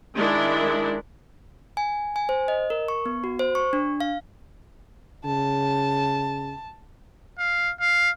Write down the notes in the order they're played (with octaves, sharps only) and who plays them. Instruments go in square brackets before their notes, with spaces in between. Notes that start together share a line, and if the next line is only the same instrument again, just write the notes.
[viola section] D#3 G#3 D4 E4
[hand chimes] G#5
G#5
C5
D#5
A#4
C#6
B3
F#4
C5
C#6
D4
F5
[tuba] C#3 [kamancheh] A5
[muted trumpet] F5
F5